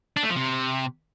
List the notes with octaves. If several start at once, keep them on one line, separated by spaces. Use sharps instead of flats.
D4
A3
F3
C3